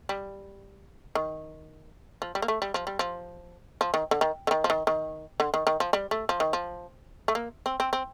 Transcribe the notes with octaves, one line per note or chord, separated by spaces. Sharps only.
G3
D#3
F3
G3
A#3
A3
G3
F3
G3
F3
F3
D#3
D3
D#3
D3
D#3
F3
D#3
D#3
D3
D#3
D#3
F3
G3
A3
F3
D#3
F3
A3
A#3
C4
C4
C4